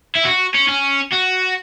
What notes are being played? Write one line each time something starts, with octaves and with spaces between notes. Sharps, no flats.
E4
F#4
C#4
C#4
F#4